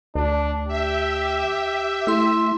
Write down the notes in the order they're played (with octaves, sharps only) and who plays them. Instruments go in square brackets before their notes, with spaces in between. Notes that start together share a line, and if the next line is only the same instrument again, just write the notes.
[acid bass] D2 [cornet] D4
[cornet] G4 [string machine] E5
[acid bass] A3 [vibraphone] E4 C6